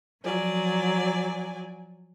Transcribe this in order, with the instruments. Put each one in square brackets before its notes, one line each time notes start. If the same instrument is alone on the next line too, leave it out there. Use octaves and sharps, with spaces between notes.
[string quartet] F3 F#3 D5 G#5